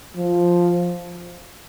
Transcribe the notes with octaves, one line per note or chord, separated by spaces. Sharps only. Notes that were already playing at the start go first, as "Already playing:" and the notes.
F3